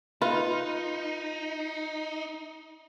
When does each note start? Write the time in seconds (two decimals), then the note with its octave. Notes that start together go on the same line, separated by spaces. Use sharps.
0.22 D#4 F4 B4